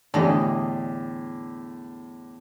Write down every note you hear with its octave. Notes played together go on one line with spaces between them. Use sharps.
E2 A2 D3 D4 G4 D#5